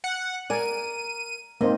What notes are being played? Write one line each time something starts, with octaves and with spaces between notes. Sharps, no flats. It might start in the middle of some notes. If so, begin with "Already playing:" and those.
F#5
A#4 D5 G#5 D#7
G#2 A#3 C4 C5 D#5